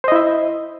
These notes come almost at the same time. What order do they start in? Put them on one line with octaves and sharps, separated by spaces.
C5 D#5 E4 E5